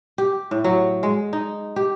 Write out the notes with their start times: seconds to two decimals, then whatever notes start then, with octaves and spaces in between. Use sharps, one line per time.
0.18 G4
0.51 A2
0.64 F#3
1.03 G#3
1.33 D#4
1.76 G4